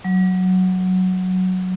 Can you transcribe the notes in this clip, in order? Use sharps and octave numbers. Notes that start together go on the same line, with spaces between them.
F#3